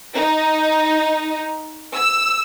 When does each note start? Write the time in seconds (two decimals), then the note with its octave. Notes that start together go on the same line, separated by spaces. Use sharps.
0.17 D#4
1.95 E6